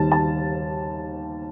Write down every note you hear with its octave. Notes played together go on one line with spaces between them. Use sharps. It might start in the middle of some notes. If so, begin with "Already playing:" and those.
Already playing: D#2 D#3 G3 A5
A5